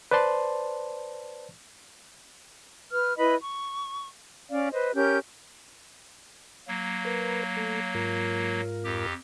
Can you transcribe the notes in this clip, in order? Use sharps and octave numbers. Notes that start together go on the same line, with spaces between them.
B4 C5 D5 A5 C6
B4 F6
E4 B4 D#5 B5
C#6
C#4 D5 F5
B4 C5 D#5
C#4 G4 A#4 G6
F#3 A#3
A#4 B4
A3 A4
G#2 F4 A#4
F2 G4